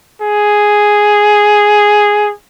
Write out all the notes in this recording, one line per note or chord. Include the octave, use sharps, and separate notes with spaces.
G#4